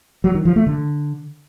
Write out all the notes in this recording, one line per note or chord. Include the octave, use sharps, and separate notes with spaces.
F#3
D#3
F3
A3
D3